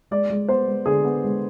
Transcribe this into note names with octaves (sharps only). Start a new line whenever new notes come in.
G#3 D5
G#3
B3 C5
G#3
D3 G#4
B3
G#3